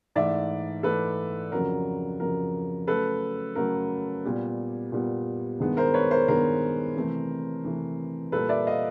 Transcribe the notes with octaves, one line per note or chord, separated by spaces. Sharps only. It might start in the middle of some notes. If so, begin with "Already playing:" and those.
G#2 E3 A3 D5 E5
G#2 E3 A3 A4 B4
F2 C#3 F#3 A#4
F2 C#3 F#3 A#4
C#3 F#3 A3 A4 B4
C#3 F#3 A3 A#4
A#2 G3 B3
A#2 G3 B3
G2 D#3 G#3 B3
A#4 C5
B4 C#5
A#4 C5
G2 D#3 G#3 B3 A#4 C5
C3 E3 A3
C3 E3 A3
A#2 G3 A#3 A4 B4
D5 E5
D#5 F5